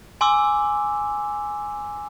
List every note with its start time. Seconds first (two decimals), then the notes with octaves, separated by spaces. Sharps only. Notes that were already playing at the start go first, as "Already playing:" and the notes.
0.21 G#5 C6 D6 E6